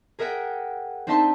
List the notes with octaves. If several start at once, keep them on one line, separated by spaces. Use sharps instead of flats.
G#4 A#4 E5 F#5 G5
C4 D4 D#4 E5 A5 C6